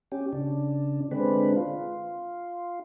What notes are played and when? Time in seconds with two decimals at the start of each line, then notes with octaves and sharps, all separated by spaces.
0.12 C#4 G4
0.33 C#3 D4
1.11 D3 G#3 C4 D4 B4
1.56 F4